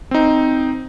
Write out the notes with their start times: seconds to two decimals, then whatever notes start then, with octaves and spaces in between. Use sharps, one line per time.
0.11 C4 D#4